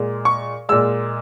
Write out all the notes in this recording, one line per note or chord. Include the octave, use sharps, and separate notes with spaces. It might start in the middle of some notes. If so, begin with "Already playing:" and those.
Already playing: A#2 G#3
C#6
A#2 G#3 E6